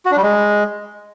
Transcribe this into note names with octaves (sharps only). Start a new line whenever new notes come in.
F#4
D4
G3
G#3